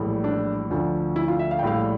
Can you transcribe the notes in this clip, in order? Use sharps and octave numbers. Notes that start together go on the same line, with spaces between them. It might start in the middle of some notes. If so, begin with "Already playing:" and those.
Already playing: A#1 A2 E3 G3
D4
D2 D3 F3
E4
F4
E5
F5
G5
A#1 A2 G3 F5